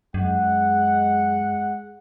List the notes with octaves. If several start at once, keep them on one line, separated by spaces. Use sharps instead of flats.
F#2 G#3 F#5